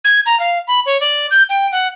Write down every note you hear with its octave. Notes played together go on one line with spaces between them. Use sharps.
G#6
A#5
F5
B5
C#5
D5
G6
G5
F#5